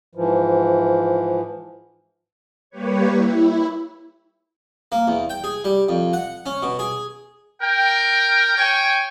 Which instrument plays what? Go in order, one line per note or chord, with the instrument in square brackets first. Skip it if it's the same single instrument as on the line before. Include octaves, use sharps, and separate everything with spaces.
[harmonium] G#2 E3 F3
[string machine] G3 A#3 G4 B4 C#5
E4
[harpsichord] A#3
E2
G5
G#4
G3
F2
F#5
C#4
B2
G#4
[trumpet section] A#4 G5
C#5 G5 G#5